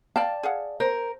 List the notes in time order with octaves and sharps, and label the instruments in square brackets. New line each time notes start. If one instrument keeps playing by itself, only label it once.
[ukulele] D5 G5 A5 [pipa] F5
[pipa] G#4 F5 F#5
[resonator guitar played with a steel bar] A#4 [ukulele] C5